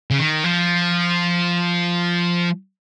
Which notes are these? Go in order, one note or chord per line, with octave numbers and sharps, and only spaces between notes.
C#3
D#3
F3